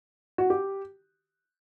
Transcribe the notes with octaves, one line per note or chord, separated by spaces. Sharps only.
F#4
G4